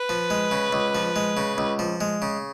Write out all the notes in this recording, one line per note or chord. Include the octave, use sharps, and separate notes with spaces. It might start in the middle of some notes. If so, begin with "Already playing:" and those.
Already playing: B4
F3
G#3
C#3
C#2
F3
G#3
C#3
C#2
F3
G#3
C#3